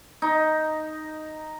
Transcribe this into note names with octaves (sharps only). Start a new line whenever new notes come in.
D#4